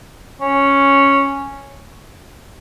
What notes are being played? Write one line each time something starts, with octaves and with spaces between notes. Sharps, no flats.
C#4